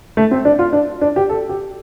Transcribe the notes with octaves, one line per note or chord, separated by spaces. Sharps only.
A3
C4
D4
F4
D4
D4
G4
A4
G4